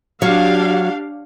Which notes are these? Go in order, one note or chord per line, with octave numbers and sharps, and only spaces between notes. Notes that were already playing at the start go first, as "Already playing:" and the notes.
F#3 D4 G4 F5